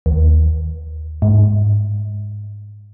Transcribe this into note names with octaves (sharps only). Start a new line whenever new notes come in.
D#2
G#2